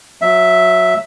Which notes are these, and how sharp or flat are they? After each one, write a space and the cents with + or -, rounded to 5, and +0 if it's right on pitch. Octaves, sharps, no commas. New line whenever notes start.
F#3 -15 E5 +0